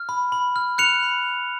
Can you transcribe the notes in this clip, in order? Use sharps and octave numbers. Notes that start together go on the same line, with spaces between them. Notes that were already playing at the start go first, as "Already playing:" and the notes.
Already playing: F6
B5
B5
F6
F#6 C#7 F7
B5